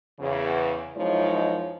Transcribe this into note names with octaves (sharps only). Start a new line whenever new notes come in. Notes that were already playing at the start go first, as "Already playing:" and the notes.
E2 C#3
F#2 F3 G#3 D#4 E4 C#5